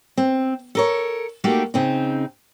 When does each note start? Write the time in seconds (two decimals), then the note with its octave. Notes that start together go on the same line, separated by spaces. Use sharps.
0.17 C4
0.75 A4 A#4 C#5
1.44 A3 A#3 D#4 F#4 G4
1.74 C#3 C4 D#4